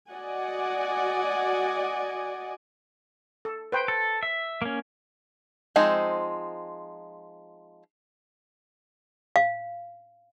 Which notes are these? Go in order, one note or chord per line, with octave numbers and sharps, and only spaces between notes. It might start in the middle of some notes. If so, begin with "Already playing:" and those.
F#4 D5 D#5 F#5 G#5
A4
B4 C5 G5
A4
E5
A#3 C#4
F3 G#3 C4 D#4
F5